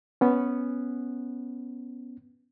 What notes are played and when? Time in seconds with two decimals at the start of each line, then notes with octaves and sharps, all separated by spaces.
0.21 B3 C#4